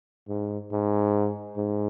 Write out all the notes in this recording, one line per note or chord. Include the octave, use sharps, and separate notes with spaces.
G#2
G#2
G#2